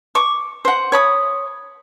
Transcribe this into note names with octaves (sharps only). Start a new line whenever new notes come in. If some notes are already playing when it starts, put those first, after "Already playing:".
C#6 D6
C5 F#5
C#5 B5 D#6